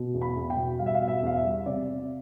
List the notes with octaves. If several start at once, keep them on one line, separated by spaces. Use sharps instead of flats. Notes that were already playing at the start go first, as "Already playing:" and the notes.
Already playing: B2
E2
B5
E2
G5
B2
G3 F5
E5
F5
B2
E5
E2 F5
E5
G3
C3 D5
C3